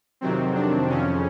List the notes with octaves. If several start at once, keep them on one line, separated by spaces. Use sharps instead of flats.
F2 C3 D#3 F#3 C4
D4
F2 C#3 F3 C#4